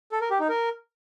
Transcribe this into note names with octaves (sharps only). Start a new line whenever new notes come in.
A4
A#4
G4
D#4
A#4